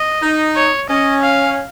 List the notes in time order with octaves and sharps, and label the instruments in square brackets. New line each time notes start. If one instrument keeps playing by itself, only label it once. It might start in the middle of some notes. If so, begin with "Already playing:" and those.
Already playing: [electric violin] D#5
[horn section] D#4
[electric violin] C#5
[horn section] C#4 [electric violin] D#5
[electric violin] F5